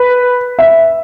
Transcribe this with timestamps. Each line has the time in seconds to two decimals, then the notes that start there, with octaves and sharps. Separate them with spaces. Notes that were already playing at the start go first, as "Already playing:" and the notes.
Already playing: B4
0.59 E5